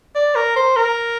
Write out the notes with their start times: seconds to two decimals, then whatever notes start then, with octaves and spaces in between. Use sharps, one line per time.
0.15 D5
0.35 A#4
0.56 C5
0.76 A#4